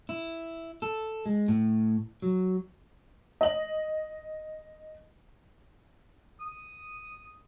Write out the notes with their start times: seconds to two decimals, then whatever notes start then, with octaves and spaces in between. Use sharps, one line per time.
0.09 E4
0.82 A4
1.26 G#3
1.48 A2
2.22 F#3
3.41 D#5 F#7
6.39 D#6